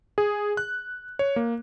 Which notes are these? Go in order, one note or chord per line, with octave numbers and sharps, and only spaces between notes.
G#4
F#6
C#5
A#3